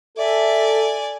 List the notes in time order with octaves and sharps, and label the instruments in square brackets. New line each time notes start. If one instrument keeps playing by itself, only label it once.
[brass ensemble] A4 [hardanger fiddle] D5 G#5 [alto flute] E5